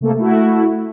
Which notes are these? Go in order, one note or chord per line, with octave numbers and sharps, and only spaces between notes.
C3 A3 A#3 A4
A3 E4 F#4